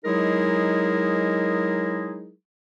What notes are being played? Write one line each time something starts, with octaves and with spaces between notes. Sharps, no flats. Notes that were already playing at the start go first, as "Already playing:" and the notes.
F#3 G#3 D#4 E4 G#4 A#4